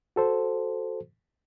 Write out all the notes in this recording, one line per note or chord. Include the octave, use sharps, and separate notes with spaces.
F#4 A4 C5